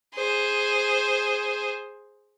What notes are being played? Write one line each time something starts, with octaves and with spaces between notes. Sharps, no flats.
G#4 C5